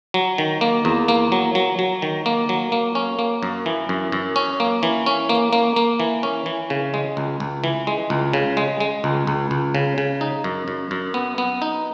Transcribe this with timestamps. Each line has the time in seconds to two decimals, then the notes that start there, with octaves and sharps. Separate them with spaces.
0.14 F#3
0.38 D#3
0.61 A#3
0.85 E2
1.08 A#3
1.32 F#3
1.55 F#3
1.79 F#3
2.02 D#3
2.26 A#3
2.49 F#3
2.72 A#3
2.95 C#4
3.19 A#3
3.43 F#2
3.66 E3
3.89 F#2
4.12 F#2
4.36 C#4
4.60 A#3
4.83 E3
5.06 C#4
5.29 A#3
5.53 A#3
5.76 A#3
6.00 E3
6.23 C#4
6.46 E3
6.70 C#3
6.94 G#3
7.17 C#2
7.40 C#2
7.64 E3
7.87 G#3
8.10 C#2
8.33 C#3
8.57 G#3
8.80 G#3
9.04 C#2
9.27 C#2
9.51 C#2
9.75 C#3
9.98 C#3
10.21 D#4
10.44 F#2
10.68 F#2
10.91 F#2
11.14 B3
11.38 B3
11.62 D#4